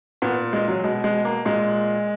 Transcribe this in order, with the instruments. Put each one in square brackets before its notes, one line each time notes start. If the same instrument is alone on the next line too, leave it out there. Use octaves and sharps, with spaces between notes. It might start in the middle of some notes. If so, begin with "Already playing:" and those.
[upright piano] A#2 B3
G#3
F#3
B2 G#3
G#3
A#3
A#2 G#3